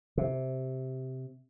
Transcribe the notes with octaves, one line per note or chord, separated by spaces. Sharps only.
C3